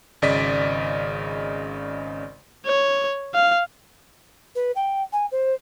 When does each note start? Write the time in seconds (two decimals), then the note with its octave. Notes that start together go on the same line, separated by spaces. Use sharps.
0.22 G#1 C#3 D5 D#5 B6
2.66 C#5
3.34 F5
4.55 B4
4.75 G5
5.12 G#5
5.31 C5